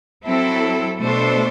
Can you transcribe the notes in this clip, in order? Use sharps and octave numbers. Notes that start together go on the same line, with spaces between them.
F#3 C4 E4 A4
B2 A3 D4 A4 C5